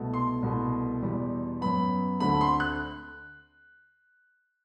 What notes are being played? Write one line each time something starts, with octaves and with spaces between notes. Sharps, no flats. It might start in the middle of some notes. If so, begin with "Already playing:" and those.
Already playing: C2 B2 A3
C6
C2 B2 A3
E2 B2 G3
F#2 F#3 B3 B5
D2 D3 A3 C4 B5
C6
F#6